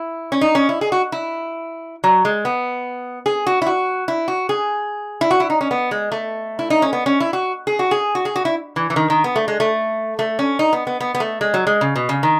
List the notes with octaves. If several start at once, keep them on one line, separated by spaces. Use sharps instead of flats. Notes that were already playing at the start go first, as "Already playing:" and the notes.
Already playing: E4
C#4
D#4
C#4
E4
G#4
F#4
E4
F#3
G#3
B3
G#4
F#4
E4
F#4
E4
F#4
G#4
E4
F#4
E4
D#4
C#4
B3
G#3
A3
E4
D#4
C#4
B3
C#4
E4
F#4
G#4
F#4
G#4
F#4
G#4
F#4
E4
E3
E3
D#3
D#3
B3
A3
G#3
A3
A3
C#4
D#4
B3
B3
B3
B3
A3
G#3
F#3
G#3
C#3
B2
C#3
D#3